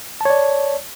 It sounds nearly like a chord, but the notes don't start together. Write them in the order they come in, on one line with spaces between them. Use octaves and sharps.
A5 C#5 D5